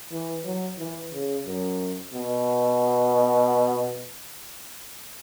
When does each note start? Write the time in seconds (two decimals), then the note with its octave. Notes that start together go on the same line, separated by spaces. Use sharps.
0.11 E3
0.44 F#3
0.78 E3
1.12 C#3
1.45 F#2
2.13 B2